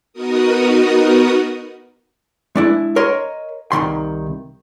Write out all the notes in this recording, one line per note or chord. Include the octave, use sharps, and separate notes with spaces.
B3 D#4 F#4 A#4 D#6
G#3 D4 E4
A#4 C#5 D#5 C6
C2 F2 D#3 C6